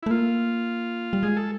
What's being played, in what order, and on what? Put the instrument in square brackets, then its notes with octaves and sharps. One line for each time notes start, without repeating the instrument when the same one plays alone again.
[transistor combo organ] E4
[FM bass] A3
[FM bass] A#3 [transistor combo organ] F4
[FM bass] G3
[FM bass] G#3 [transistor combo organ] G#4
[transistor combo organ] A4